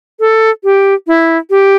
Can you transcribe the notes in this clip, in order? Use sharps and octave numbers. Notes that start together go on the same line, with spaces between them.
A4
G4
E4
G4